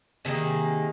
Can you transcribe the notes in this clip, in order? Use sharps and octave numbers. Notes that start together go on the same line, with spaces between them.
C3 D#3 A#3 G#4